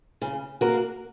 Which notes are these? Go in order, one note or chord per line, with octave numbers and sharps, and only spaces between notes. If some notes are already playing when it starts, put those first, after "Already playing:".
C#3
A#3 F#4 A#4